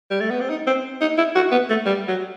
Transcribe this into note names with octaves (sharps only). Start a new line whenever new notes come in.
G3
A3
B3
C4
D#4
C4
D#4
E4
F#4
B3
A3
G3
F#3